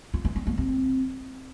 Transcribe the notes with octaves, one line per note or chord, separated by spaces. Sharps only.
F4
B3
G3
A#3
C4